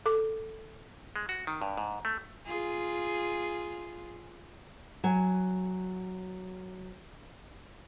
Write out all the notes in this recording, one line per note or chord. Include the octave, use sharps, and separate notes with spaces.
A4 D6
G#3
F#4
D#3
G2
G#2
A3
F4 G#4
F#3 G#5